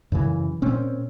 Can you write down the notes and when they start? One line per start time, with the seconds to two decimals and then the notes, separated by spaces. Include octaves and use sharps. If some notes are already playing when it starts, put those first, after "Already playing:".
0.12 F#2 C#3 E3
0.62 A#2 C4 C#4